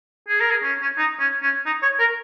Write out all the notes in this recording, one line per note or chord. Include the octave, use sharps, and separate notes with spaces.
G#4
A#4
G#4
C#4
C#4
D#4
C#4
C#4
D#4
C#5
A#4